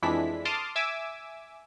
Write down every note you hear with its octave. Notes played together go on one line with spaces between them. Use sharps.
F2 E3 G#3 D4 E4 B6
A5 C6 D6 D#6 F6
E5 G#5 D6 E6